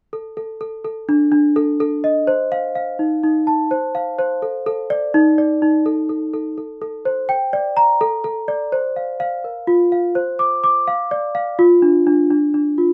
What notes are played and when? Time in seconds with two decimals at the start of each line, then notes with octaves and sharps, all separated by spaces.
0.13 A4
0.37 A4
0.61 A4
0.85 A4
1.09 D4
1.32 D4
1.56 A4
1.80 A4
2.04 D#5
2.27 C5
2.52 F5
2.75 F5
2.99 D#4
3.23 D#4
3.47 A5
3.71 C5
3.95 F5
4.19 C5
4.42 A4
4.66 A4
4.90 D5
5.14 D#4
5.38 D5
5.62 D#4
5.86 A4
6.09 A4
6.33 A4
6.58 A4
6.82 A4
7.05 C5
7.29 G5
7.53 D5
7.77 A#5
8.01 A4
8.24 A4
8.48 D5
8.72 C5
8.96 F5
9.20 F5
9.44 A#4
9.67 F4
9.92 F5
10.15 C5
10.39 D6
10.64 D6
10.87 F5
11.11 D5
11.35 F5
11.59 F4
11.82 D4
12.07 D4
12.30 D4
12.54 D4
12.78 F4